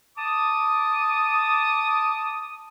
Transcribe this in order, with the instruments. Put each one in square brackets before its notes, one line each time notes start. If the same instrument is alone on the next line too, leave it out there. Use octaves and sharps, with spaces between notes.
[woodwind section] A5 D6 D#6